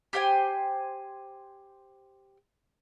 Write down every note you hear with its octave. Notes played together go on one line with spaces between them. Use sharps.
G4 C5 G5 G#5